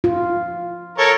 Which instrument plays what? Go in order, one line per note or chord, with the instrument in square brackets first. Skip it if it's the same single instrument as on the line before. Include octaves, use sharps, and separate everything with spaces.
[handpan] F4
[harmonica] A4 A#4 C#5